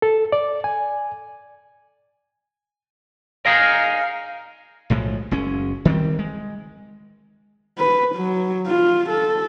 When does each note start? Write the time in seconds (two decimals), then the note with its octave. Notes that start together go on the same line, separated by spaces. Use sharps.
0.02 A4
0.32 D5
0.64 G#5
3.46 D#4 G#4 A#4 F5
4.90 B1 A2 F3 G#3
5.31 F#1 G#3 C#4
5.85 D#3 G3 B3 C4
6.19 G#3
7.79 B4
8.15 F#3
8.67 F4
9.10 A4